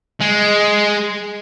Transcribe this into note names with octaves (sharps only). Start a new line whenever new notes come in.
G#3